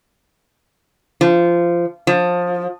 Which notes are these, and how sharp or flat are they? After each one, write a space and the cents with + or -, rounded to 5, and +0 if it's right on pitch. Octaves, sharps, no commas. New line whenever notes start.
F3 -20
F3 +20